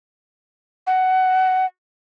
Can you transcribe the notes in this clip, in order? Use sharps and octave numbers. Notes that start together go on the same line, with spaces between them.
F#5